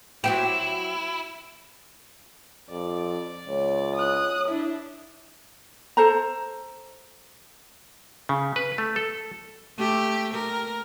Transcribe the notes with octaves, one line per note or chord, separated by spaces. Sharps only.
F#3 C4 E4 G4
F2 D5
C#2 C#5
C#5 D#6 F#6
D4 E4
A4 C5 A#5
C#3
B4
A3
A4
A3 G4
A#4